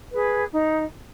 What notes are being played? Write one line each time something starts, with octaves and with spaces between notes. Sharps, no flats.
G#4 B4
D#4